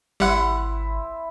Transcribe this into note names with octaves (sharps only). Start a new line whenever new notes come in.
G#1 G3 C4 E4 F#5